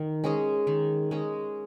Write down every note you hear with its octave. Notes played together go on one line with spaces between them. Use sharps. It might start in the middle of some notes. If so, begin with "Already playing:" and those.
Already playing: D#3
G#3 C#4 G#4
D#3
G#3 C#4 G#4